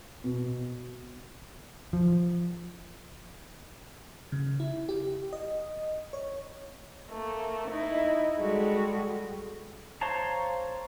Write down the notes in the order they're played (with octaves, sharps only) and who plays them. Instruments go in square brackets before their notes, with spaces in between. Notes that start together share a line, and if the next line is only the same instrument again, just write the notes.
[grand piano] B2
[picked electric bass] F3
[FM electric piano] C#3
E4
G4
D#5
C#5
[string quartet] A3 A#3
D#4 E4
G3 G#3 F#4 A4
[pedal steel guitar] C5 C#5 F5 A5 A#5